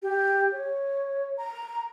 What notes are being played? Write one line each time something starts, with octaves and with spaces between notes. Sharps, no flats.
G4
C#5
A#5